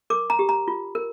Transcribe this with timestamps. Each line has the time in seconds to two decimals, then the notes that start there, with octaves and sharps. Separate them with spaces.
0.10 A#4 D6
0.30 A#5
0.39 G4
0.49 A#5
0.68 F4
0.95 A#4